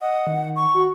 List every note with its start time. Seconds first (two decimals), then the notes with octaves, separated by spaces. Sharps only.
0.01 D#5 F#5
0.27 D#3
0.56 C#6
0.74 F#4